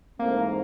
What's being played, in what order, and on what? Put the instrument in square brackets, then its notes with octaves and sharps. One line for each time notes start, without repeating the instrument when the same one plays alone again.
[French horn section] G#2 E3 A3 C4 [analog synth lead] A#3